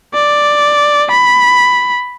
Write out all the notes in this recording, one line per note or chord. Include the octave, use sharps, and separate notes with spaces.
D5
B5